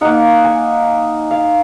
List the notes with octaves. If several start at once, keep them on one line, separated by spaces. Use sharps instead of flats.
A#3 D#4 F#5
G#5
F5